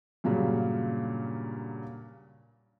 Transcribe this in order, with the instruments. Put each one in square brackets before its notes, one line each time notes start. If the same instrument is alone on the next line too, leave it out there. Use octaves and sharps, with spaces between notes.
[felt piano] G2 A#2 C#3 F#3